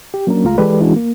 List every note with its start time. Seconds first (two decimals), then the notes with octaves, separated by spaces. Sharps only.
0.14 G4
0.27 F#3 A#3 C#4 D4 A#4
0.44 C#2 G#3 A3 F4 F5 A#5
0.58 E3 G#3 G4 A4 B4 D5
0.80 E3 G#3 C#4 D4 E4 F#4
0.96 A#3